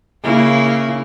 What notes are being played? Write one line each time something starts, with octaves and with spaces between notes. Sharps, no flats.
C#3 A#3 E4